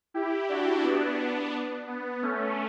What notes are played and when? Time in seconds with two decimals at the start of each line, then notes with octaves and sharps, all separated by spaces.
0.14 E4 G4
0.49 D4 F#4
0.83 B3 D4
1.87 B3
2.22 A3 C#4